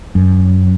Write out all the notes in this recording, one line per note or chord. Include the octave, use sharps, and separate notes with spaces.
F#2